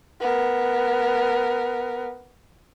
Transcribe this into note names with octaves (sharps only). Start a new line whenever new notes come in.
B3 A#4